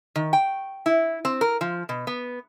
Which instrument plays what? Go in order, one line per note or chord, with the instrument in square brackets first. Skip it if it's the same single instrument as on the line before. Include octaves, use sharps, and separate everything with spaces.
[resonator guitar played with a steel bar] D#3
G5
E4
C4
A#4
F3
B2
B3